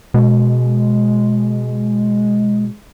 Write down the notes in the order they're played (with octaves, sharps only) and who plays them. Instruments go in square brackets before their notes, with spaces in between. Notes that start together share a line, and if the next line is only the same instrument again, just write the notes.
[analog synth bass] B2 [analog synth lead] G#3